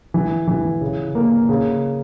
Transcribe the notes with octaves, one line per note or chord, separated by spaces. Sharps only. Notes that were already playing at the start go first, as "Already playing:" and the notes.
E3
E3
C#3
A#3
C#3